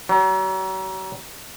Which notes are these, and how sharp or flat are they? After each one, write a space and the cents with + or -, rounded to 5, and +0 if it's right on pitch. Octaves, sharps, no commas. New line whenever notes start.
F#3 +40